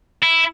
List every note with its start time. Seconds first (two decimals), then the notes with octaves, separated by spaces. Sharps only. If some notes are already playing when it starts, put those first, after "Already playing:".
0.23 E4